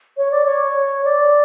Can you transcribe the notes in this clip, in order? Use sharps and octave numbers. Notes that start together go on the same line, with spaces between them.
C#5
D5
C#5
D5